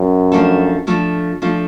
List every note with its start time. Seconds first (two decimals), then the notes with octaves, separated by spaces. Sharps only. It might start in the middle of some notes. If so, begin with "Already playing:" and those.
Already playing: F#2
0.32 F3 A3 D4 F4 A4
0.87 F3 A3 D4 F4 A4
1.42 F3 A3 D4 F4 A4